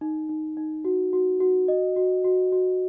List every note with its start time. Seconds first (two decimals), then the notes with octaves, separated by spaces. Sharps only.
0.01 D#4
0.29 D#4
0.57 D#4
0.85 F#4
1.13 F#4
1.40 F#4
1.68 D#5
1.96 F#4
2.24 F#4
2.52 F#4